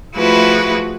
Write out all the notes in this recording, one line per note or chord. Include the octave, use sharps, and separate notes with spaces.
F3 A3 E4 F#4 G#4 B4